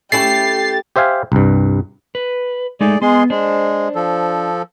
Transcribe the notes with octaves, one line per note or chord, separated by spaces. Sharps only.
A3 C#4 E4 G4 A6 C7
G4 C5 E5 F5 G#5
C2 G2
B4
G#3 A3 D#4 G#4 D5
G#3 B3 G#4 C6
G#3 D4 C5
F3 A4